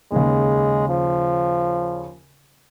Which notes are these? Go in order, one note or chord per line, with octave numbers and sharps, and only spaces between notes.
D#2 C#3 G#3
F3